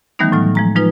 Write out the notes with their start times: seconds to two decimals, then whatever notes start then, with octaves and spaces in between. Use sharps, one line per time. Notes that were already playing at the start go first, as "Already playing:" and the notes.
0.19 D#3 E3 G3 A3 B3 D#4
0.32 A2 F#3 F6
0.55 F3 G#3 A#5
0.76 F3 G#3 D#4 F4 B4